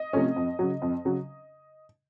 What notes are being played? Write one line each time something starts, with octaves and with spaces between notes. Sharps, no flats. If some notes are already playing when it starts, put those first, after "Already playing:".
Already playing: D#5
C3 F3 A3 C#4
F2
C#3 F#3
F2
C#3 F#3